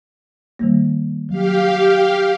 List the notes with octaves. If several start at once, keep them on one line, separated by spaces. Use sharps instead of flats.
D#3 G3 A#3
F#3 G4 F5